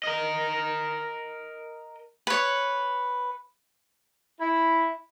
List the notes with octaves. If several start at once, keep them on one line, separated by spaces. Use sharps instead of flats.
A#4 D#5
B4 C#5
E4